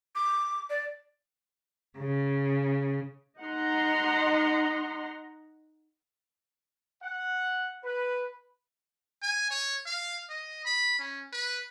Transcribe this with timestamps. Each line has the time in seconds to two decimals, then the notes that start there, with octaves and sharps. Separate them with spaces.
0.15 D6
0.70 D5
1.99 C#3
3.42 D#4 D#5 F#5 A#5 C6
7.03 F#5
7.84 B4
9.22 G#5
9.51 C#5
9.86 F5
10.29 D#5
10.65 B5
10.99 C#4
11.32 B4